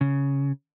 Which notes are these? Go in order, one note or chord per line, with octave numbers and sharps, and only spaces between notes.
C#3